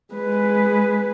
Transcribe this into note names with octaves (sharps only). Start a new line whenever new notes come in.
G#3 B4